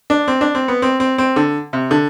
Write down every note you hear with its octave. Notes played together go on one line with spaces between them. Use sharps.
D4
C4
D4
C4
B3
C4
C4
C4
D3
C3
D3